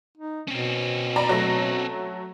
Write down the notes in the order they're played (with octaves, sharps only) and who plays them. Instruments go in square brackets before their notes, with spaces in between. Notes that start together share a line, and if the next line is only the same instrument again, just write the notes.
[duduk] D#4
[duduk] B2 [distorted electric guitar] C4 C#4
[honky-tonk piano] D5 A#5 B5
F#3 A3 A#6